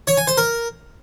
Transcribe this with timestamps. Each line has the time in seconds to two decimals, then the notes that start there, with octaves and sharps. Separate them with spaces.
0.07 C#5
0.17 G#5
0.27 C5
0.37 A#4